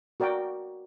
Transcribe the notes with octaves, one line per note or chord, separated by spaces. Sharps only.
F#4 A#4 D5 G5